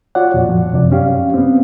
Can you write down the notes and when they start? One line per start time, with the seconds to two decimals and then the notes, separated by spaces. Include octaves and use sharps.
0.15 F4 F#4 C#5 D5 F#5
0.34 F2 A#2
0.49 F3
0.74 F#2 C3 D5
0.92 C#4 G4 F5
1.34 B3 C4